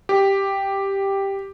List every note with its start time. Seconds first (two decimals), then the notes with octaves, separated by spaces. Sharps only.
0.09 G4